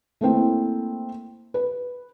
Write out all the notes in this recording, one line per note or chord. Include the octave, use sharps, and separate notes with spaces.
A3 A#3 C4 E4
B4